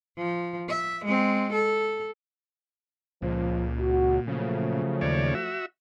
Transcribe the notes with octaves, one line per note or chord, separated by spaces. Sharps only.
F3
E5
G#3 C4
A4
C#2 A#2 F3
F#4
C#3 F3 F#3 A3
D#2 C#5 D5
F#4 E5